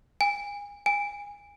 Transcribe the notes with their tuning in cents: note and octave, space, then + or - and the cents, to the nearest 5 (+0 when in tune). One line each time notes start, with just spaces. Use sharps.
G#5 -30
G#5 -25